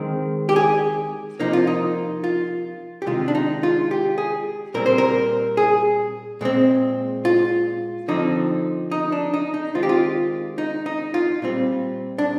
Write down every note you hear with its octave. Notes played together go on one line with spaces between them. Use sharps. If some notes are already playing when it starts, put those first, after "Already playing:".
Already playing: D#3 G#3 C4 A#4
G4
G#4
C3 F3 A#3 D#4
F4
D#4
F4
G4
C3 D#3 G#3 F4
D4
D#4
F4
G4
G#4
A#2 G3 C4 A#4
C5
A#4
G#4
A#2 G#3 C4
F4
D3 F3 C4 D#4
D#4
D4
D#4
D#4
D#3 G#3 C4 F4
G4
F4
D#4
D#4
F4
A#2 G3 C4
D4